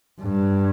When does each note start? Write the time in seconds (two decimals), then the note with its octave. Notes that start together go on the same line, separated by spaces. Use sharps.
0.21 G2